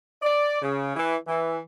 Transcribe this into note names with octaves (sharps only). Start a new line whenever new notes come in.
D5
C#3
E3
E3